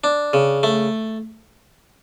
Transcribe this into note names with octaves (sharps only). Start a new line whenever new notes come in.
D4
C#3
A3